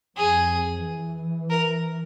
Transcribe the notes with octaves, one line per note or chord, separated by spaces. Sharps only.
F2 G#4
E3
A#4